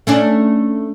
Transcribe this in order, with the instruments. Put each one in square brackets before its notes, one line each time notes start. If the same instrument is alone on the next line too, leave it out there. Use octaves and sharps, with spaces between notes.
[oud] A3 C#4 D4